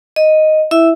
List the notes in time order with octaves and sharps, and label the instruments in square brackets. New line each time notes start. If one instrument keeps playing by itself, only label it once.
[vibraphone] D#5
E4 E5 E6